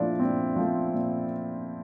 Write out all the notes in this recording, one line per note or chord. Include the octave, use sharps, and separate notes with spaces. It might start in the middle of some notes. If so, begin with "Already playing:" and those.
Already playing: A#2 F3 A3 D4 E4
A#2 C4
F3 A3
A#2